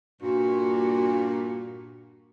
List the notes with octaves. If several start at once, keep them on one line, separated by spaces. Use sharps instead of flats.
G2 A#2 F#4